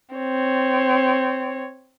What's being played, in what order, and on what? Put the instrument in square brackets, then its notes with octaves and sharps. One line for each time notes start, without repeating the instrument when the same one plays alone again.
[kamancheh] C4 C#5